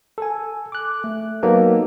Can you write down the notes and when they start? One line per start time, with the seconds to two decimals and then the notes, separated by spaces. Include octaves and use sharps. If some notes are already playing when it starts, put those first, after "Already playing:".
0.18 A4 G#5
0.72 D6 F#6
1.04 A3
1.43 F#3 A#3 B3 D#4 A4